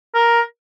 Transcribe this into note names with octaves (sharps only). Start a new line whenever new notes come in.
A#4